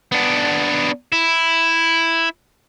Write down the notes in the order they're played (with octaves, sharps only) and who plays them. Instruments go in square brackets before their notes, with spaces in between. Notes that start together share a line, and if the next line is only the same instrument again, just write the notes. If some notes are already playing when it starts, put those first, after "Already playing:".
[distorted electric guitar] B3 D4
E4